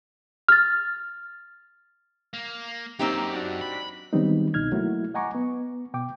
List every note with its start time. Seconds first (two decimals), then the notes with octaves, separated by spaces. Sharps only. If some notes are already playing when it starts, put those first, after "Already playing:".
0.49 F6 A6
2.33 A#3
2.99 F#2 A#3 C4 D#4 G4
3.31 D4 F#4
3.61 B5
4.13 D#3 F#3 G3 B3 C4 D#4
4.54 C2 B2 D#4 F6 G#6
4.72 F#3 A3 A#3 E4 F#4
5.14 D#5 F#5 G#5 A#5 C#6 D6
5.35 B3
5.94 B2 G5 D6